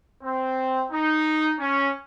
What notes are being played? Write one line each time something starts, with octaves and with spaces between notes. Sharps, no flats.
C4
D#4
C#4